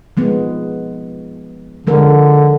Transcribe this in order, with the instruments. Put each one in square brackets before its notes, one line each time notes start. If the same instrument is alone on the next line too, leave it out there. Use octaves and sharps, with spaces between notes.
[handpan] F3 G#3 B3
[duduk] D3 [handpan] F3 G#3 A#4